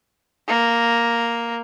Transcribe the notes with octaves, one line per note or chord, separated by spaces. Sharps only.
A#3